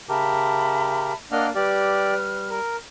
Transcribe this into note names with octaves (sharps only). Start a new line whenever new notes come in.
C#3 G4 A#4 E5 A5 B5
A#3 D4 A#4 D5 D#5 F#5 F6
G3 G4 B4 D5 F6
A#4